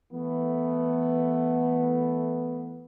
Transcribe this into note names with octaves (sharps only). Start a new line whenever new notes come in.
E3 A3 B3